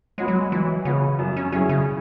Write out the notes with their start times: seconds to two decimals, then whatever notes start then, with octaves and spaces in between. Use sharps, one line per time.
0.18 G#3 B3 F#4 C#5
0.28 F#3
0.38 G#3
0.52 E3 F#3
0.85 C#3 B3 F#4 C#5
1.19 F#2
1.36 C#4
1.52 F#3 C#4 E4 G#4
1.69 C#3